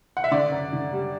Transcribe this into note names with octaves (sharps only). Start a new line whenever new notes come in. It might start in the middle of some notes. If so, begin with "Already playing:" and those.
F#5
E5
D3 D5
F#2
D3
G3